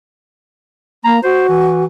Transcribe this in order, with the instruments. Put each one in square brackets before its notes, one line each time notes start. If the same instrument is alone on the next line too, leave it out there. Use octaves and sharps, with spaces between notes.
[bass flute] A#3 [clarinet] A#5
[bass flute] F#4 [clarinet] C5
[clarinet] E3